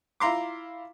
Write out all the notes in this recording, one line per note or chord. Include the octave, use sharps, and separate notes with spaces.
E4 F4 A#5 C6 D6